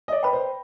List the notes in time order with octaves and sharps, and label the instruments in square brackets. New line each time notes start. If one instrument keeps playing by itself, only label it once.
[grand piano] D#5
D5
[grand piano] B4 [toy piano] G5 B5
[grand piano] C5